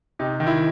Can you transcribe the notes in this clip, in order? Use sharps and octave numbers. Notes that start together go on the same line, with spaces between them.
C3 D#4
D#3
E4